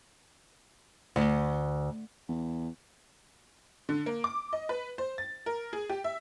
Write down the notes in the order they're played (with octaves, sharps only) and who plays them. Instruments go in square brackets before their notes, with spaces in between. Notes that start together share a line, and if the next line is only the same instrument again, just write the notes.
[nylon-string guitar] D2
[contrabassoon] E2
[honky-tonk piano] D3
A#3
D6
D#5
B4
C5
A6
A#4
G#4
G4
E5